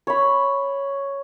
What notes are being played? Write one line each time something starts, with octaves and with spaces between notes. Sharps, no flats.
C#5 B5